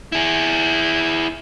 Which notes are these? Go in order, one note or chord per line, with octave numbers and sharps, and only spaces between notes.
E4 G#4